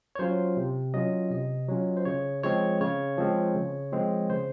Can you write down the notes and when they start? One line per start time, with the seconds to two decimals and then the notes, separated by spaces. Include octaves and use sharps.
0.15 C#5
0.19 F#3 C#4 F4 C5
0.57 C3
0.94 F#3 C#4 F4 D#5
1.31 C3 D#5
1.68 F#3 C#4 F4
1.97 C5
2.05 C#3 C#5
2.43 F3 G#3 C4 C#5
2.81 C#3 C#5
3.18 F3 G#3 C4
3.55 C#3
3.92 F3 G#3 C4
4.30 C#3 C5